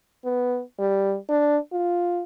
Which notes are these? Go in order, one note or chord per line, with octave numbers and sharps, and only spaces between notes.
B3
G3
D4
F4